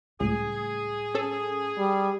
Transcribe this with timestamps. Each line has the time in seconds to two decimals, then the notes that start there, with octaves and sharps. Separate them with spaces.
0.20 C#2 A2 G3 G#4
1.14 C#4 A4
1.79 G3